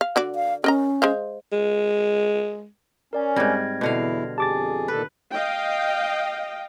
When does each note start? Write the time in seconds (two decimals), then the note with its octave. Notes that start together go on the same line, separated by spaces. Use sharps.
0.01 F5
0.16 D3 F#4 D5
0.35 F5
0.64 C#4 A#4 D#5 A#5
1.02 G#3 C5 F5
1.52 G#3
3.13 C#4 A#4 D5 G#5
3.36 G#2 G3 C4 F6 G#6 A#6
3.81 E2 B2 D3 E4 F5
4.38 F2 G4 G#4 A5 D6 A6
4.88 A#2 D#3 A4 B4
5.31 D#5 F5 G5